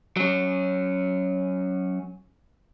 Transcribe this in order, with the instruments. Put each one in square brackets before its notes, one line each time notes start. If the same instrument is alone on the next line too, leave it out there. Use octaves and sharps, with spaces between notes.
[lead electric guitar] F#3 C#4